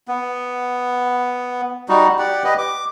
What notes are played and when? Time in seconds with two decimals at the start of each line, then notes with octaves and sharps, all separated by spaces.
0.08 B3
1.89 G3 D#4 F#4
2.19 G4 D5 F#5
2.44 G4 B4 D#5
2.58 D6